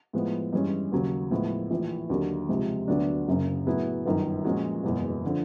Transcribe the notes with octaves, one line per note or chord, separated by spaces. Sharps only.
A2 F3 G#3 B3
G2 E3 G#3 C#4
D#2 C#3 F#3
A2 F3 G#3 B3
A#1 A2 E3
D#2 D3 F#3 A#3
C#2 C3 F3 G#3
D2 D3 F#3 B3 D4
F#1 F#2 C#3
A2 F#3 B3 E4 G#4
G1 F#2 D#3
A#2 F3 G#3 C#4 F#4
F#1 E2 B2 G#3
D3 F3